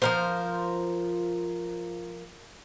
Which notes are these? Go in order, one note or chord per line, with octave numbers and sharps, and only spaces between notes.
F3 A#4 C5